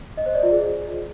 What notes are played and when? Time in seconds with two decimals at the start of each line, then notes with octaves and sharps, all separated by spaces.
0.17 D#5
0.26 C5
0.34 D5
0.43 F4
0.52 G#4